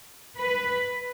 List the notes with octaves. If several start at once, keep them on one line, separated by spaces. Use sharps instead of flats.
B4